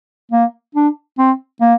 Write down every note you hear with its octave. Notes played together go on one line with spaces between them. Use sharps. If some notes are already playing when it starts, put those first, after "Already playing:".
A#3
D4
C4
A#3